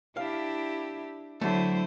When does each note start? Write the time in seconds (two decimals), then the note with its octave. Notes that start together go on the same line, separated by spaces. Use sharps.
0.17 D4 E4 G4 F5
1.41 D3 F#3 A3 E4 C5